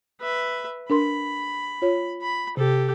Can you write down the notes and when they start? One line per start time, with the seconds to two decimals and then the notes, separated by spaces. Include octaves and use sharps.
0.21 B4 E5
0.90 D4 A#4 B5 C6
1.82 F4 C#5
2.22 B5
2.57 C3 G4 A4